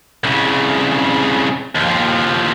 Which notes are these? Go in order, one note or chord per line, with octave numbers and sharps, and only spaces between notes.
C2 C#3
D#2 F3